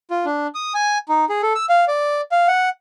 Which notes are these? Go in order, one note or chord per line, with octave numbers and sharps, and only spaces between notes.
F4
D4
D#6
G#5
D#4
G#4
A4
E6
F5
D5
F5
F#5